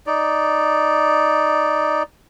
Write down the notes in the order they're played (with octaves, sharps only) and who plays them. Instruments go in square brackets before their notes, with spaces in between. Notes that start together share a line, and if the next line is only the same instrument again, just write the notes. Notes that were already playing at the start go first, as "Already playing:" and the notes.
[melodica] D#4 D5